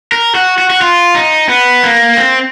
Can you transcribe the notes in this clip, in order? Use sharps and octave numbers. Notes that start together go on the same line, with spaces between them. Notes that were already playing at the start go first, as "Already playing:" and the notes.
A#4
F#4
F#4
F#4
F4
D#4
B3
A#3
C4